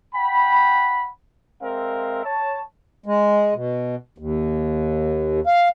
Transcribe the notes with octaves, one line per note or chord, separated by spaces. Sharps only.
F#5 G5 B5
G#3 C4 A#4 E5 F5
C#5 A5
G#3
B2
D#2
F5